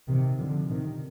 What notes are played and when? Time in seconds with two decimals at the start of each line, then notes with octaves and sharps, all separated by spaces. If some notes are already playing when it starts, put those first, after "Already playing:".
0.08 C3 D#3
0.38 D3 F3
0.69 C3 D#3